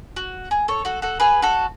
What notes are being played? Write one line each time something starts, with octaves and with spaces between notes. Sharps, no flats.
F#4
G#4
A4 C#5
F#4 A4
F#4 A4
G#4 B4
F#4 A4